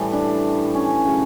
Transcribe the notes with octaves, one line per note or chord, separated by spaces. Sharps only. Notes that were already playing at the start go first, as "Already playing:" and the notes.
Already playing: A2 E3 G3 A3
D4
C#4
C#3 F#3 A3